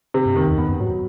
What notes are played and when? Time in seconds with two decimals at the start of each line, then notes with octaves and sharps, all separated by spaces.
0.14 C3
0.26 G2
0.36 F2 D#3
0.47 E2
0.58 F2 B3
0.69 F#2
0.80 G#2 F#3